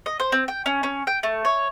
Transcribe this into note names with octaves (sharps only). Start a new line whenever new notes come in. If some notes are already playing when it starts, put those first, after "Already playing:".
D#5
C5
C4
G5
C#4
C#4
G5
A3
C#5